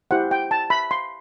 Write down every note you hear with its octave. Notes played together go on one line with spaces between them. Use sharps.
E4 G4 C5 F#5
G5
A5
B5
C6